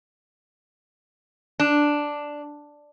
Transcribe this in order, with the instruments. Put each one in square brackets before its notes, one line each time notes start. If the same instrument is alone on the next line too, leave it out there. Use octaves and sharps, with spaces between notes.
[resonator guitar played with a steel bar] D4